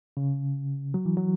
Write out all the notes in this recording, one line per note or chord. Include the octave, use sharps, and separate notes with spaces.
C#3
F#3
E3
F#3